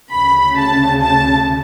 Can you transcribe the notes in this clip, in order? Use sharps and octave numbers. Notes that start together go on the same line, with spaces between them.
D2 C#3 B5
A5
A5